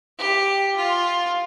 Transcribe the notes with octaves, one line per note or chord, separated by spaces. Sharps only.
G4
F4